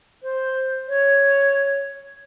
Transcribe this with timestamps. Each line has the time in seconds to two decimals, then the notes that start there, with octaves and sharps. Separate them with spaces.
0.23 C5
0.88 C#5